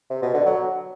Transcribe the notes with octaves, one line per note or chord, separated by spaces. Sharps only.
C3
B2
D3
F#3